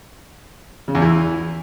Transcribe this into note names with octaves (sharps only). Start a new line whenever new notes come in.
C#3
E2
E3